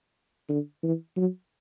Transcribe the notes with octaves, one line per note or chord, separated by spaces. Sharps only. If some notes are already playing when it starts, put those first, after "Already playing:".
D3
E3
F#3